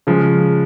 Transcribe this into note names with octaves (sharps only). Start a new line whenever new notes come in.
C#3 F3 G#3